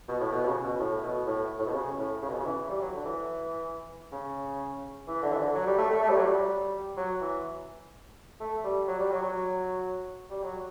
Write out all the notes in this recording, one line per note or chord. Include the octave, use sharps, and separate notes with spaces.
B2
A2
B2
B2
C#3
B2
A2
B2
A2
A2
B2
C#3
A2
C#3
B2
C#3
E3
G3
F#3
D3
E3
C#3
E3
D3
E3
D3
F#3
G3
A3
A3
A3
G3
F#3
G3
F#3
E3
A3
G3
F#3
G3
F#3
F#3
G3
F#3